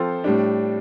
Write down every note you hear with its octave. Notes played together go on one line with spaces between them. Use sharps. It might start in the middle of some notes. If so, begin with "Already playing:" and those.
Already playing: F3 C4 F4 A4 C5
A2 G3 D4